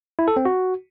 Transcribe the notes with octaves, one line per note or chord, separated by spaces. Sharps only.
E4
A4
C4
F#4